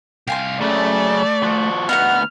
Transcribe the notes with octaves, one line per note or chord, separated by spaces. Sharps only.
C2 F5 G5 G#5 C6
F#2 C#3 A3 D5
F3 F#4
D2 B3 D#4 F#4 F#5 F6